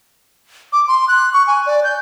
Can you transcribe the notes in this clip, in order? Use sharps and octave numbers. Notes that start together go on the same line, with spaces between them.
D6
C6
F#6
C#6
G#5
D5
G6